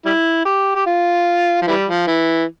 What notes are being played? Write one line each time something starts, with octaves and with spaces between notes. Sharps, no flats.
G3 E4
G4
G4
F4
F3
E3 G3
F3
E3